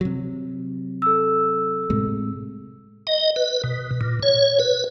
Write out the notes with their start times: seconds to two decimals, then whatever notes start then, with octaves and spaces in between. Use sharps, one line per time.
0.01 C3 F#3
1.02 A4 E6
1.90 A2 C3 G#3
3.07 D#5
3.36 B4
3.64 B2
4.01 A#2
4.23 C#5
4.60 B4